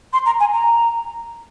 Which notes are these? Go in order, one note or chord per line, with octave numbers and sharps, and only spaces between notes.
C6
A#5
G#5
A#5